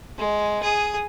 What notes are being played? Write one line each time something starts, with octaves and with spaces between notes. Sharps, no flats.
G#3
G#4 D#6